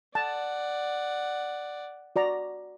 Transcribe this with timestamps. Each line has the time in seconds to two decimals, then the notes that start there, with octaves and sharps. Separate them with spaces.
0.15 D5 F#5 A5
2.16 F#4 D5 A#5